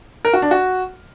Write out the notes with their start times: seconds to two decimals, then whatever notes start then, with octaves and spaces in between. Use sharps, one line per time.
0.25 A#4
0.33 F#4
0.42 D4
0.51 F#4